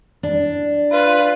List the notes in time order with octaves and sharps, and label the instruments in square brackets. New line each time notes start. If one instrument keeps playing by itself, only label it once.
[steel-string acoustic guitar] D4
[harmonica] F4 [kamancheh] B4